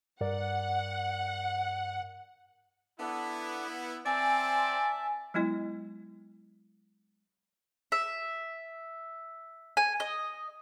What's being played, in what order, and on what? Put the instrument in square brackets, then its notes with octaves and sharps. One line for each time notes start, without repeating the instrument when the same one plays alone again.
[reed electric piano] G2 A#4 D5 [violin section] F#5
[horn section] B3 E4 [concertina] D4 A4 B4
[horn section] C4 [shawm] D5 [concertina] E5 A5 [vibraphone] G#5
[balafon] F#3 G#3 B3 E4 D#5
[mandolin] E5
G#5
D#5